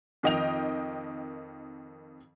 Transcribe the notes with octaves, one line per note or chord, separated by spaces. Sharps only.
F2 D#3 D#5 G5 F7